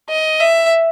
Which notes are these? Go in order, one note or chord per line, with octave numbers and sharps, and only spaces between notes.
D#5
E5